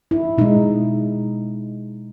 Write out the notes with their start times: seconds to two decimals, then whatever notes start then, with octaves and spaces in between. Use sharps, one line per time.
0.11 E4
0.38 B2 G#3 D#4